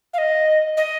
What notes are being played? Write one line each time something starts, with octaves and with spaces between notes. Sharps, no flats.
F5
D#5
D#5